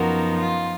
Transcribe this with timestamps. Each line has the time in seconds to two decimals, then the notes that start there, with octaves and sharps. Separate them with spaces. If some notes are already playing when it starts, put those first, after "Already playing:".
Already playing: F#2 F3 B3 D#4 F#4 A#4
0.39 F4